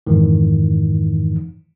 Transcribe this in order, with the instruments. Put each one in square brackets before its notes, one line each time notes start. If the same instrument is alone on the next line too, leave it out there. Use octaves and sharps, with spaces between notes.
[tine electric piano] F2 G#2 D#3 E3